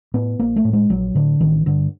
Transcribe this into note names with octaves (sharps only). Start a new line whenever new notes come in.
A2 B3
A#1 A#3
A3
A2
G#3
A#1 F#3
A2 D3
A1 D#3
G2 D3